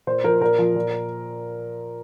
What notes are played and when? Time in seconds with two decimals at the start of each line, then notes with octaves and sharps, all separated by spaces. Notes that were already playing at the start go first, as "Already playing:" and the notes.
0.07 A#2 C5
0.24 F3 A#4
0.41 A#2 A#4
0.59 F3
0.76 A#2